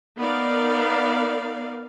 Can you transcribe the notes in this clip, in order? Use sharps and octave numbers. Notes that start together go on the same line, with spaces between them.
B3 D#4 A#4 D5 F5